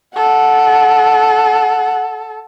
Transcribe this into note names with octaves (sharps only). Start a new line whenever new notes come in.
A4 F#5